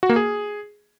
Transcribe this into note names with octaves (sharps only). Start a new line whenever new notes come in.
F#4
A#3
G#4